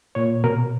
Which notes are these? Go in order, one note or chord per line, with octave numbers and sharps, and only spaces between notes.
A#2 C#5
B2 A#4